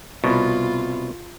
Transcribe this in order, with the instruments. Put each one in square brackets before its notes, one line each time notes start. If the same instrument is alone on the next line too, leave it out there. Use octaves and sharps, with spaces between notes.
[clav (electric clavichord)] C2 B2 [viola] F4